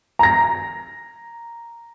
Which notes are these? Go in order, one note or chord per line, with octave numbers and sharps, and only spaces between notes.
A#5 A#6